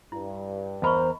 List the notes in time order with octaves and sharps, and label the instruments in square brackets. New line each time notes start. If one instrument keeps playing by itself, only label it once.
[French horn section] G2 [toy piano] E4
[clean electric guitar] E2 A#4 [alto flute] C5 [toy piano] D#5 B5 C#6